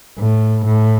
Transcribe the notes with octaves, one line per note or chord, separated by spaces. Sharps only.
A2
A2